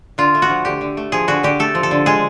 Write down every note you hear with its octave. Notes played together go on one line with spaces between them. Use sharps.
D3 F4
A3
F#4
F3
D3 G4
D3
A3
F3 G#4
D3 F#4
D3 G4
A3 A4
F3
A4
D3
G#3 G#4